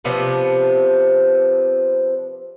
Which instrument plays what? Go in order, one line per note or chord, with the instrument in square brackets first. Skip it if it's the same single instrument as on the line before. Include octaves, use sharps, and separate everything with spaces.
[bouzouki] C3 F3 B3 D4